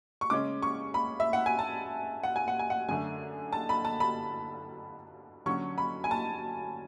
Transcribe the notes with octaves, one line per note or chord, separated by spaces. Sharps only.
C#6
C#3 G#3 C#4 D6
C#6
B5
E5
F#5
G#5
A5
F#5
G#5
F#5
G#5
F#5
F#2 D3 A3 G#5
A5
B5
A5
B5
D3 F#3 C#4 C#6
B5
G#5
A5